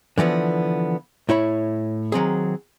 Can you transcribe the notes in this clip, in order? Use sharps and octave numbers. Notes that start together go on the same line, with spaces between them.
D3 E3 F3 B3
A2 E4 C#5 B5
D#3 F#3 C4 G#4